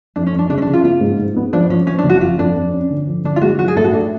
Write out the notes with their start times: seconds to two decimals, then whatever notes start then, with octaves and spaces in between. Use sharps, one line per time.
0.16 F2 D4
0.27 C#4
0.32 F2
0.39 D4
0.50 C#3 D4
0.58 C#4
0.62 D4
0.67 C#3
0.73 F4
0.84 B3 F4
1.01 G#2
1.19 G#2
1.36 B3
1.53 F3 D4
1.70 F3 C#4
1.87 F3 C#4
1.99 D4
2.04 F#1
2.10 F#4
2.21 F2 F4
2.38 F2 D4
2.56 F2
2.73 C#4
2.90 D3
3.07 F3
3.24 D3 D4
3.36 F4
3.41 G#3 F#4
3.59 F#3 F#4
3.68 G#4
3.77 A2 A4
3.84 F#4
3.93 A3 D4